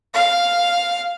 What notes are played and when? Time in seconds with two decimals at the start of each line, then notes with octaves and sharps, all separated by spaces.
0.14 F5